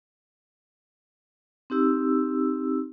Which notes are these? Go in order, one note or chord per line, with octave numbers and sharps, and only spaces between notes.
C4 D#4 G4 E6